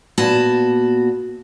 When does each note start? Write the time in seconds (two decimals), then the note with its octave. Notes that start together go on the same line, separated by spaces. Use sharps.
0.18 A#2 B3 F#4 A5